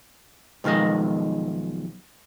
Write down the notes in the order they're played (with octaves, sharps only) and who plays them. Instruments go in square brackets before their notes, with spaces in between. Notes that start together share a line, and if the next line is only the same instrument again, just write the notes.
[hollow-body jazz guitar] B1 D#3 F3 G#3 D#5